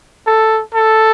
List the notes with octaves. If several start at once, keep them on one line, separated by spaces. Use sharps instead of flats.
A4
A4